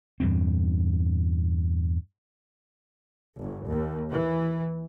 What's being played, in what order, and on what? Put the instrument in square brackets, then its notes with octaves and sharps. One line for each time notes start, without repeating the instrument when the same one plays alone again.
[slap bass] E2 G2 A#2 C4
[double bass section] G1
D#2
E3